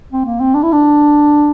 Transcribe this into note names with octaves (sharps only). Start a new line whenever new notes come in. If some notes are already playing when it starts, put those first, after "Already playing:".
C4
A#3
C4
D4
E4
D4